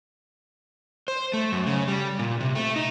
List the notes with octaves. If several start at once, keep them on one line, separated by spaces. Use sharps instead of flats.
C5
A3
F#2
C#3
G3
A#2
C3
A3
D#4